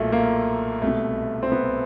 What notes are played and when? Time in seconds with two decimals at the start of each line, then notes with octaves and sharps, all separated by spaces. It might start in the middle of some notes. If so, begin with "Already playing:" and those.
Already playing: B1 A#2 A3
0.12 A#3
0.82 C2 A3
0.87 B2
1.43 C4
1.52 B3